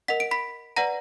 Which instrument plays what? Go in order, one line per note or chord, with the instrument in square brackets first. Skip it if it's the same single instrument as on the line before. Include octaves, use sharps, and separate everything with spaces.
[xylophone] A#4 D#5 F#5 B6
D7
B5 B6
B4 D5 F#5 A#5 A#6